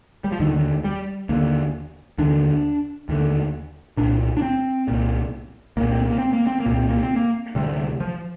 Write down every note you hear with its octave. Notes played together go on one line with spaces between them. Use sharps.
G3
F3
D#2 D3 D#3
G3
D#2 D3 A#3
D#2 D3 D4
D#2 D3
C2 A#2 D4
D4
C4
C2 A#2
C2 A#2 A#3
C4
A#3
C4
A#3
C4
A#3
C2 A#2
C4
A#3
C4
A#3
D2 C3 G3
F3